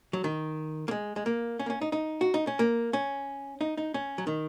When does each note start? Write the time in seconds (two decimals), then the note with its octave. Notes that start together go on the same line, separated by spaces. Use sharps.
0.13 F#3
0.24 D#3
0.88 A#3
0.91 G#3
1.16 G#3
1.26 A#3
1.59 C#4
1.66 A#3
1.70 C#4
1.81 D#4
1.92 D#4
2.21 F#4
2.34 D#4
2.47 C#4
2.59 A#3
2.93 C#4
3.61 D#4
3.77 D#4
3.94 C#4
4.18 F#3
4.27 D#3